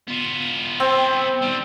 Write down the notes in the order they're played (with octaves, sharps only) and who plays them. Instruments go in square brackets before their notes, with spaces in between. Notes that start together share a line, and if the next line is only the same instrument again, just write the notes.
[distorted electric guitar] B3 F4
[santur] C4
[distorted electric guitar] D#3 G3